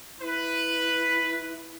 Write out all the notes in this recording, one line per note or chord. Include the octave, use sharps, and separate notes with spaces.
E4 B4